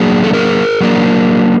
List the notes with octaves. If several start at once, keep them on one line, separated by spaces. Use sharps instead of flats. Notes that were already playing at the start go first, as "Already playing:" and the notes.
Already playing: F#3 A#3 D4 G#4
A4
G#4 A#4
F#3 A#3 D4